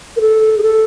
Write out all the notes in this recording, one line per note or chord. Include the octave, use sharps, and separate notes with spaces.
A#4
A4
G#4
A4